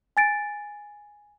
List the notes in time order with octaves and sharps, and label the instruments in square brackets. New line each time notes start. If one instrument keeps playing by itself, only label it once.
[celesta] G#5 A6 D7